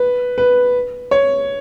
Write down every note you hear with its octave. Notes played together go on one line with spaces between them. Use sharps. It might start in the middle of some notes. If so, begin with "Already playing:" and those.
Already playing: B4
B4
C#5